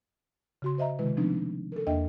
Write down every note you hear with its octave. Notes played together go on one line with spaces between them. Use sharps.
C#3 F#4 C6
C5 D#5 E5 A#5
C3 D#3 G#3 E4 B4
F3 A3 B3 C4 D4 D#4
A4 A#4
E2 A#3 D4 D#5 E5 G5